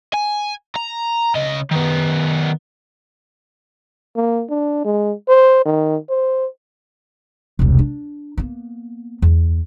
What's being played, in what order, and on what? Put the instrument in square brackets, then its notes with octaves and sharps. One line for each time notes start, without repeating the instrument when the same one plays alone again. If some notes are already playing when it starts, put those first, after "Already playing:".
[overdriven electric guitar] G#5
A#5
C#3 D#5
D#3 B3
[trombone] A#3
D4
G#3
C5
D#3
C5
[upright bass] E1 C2
D4
A#3 B3
E2